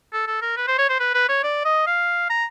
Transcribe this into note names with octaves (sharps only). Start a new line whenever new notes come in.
A4
A4
A#4
B4
C5
C#5
C5
B4
B4
C#5
D5
D#5
F5
A#5